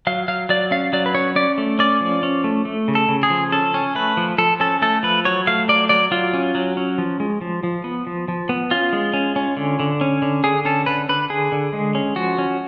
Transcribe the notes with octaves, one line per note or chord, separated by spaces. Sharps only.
F#3 F5
F#3 F5
F#3 D5
C#4 F5
F#3 D5
B4
C#4 C#5
C#4 D5
A3
C#4 D5
F3
C#4
A3
A3
C#3
A4
C#3
G#4
F3
C#4 A4
C#4
A3 B4
F3
F3 A4
C#4 A4
A3 A4
F3 B4
F#3 C#5
A3 F5
F#3 D5
F#3 D5
F#3 F4
C#4
F#3
C#4
F3
G#3
F3
F3
B3
F3
F3
B3
C#4 F4
G#3
C#4
C#4
D3
D3
C#4
D3
D3 G#4
C#4 A4
D3 B4
D3 B4
D3 G#4
D3
G#3
C#4
F3 F#4
C#4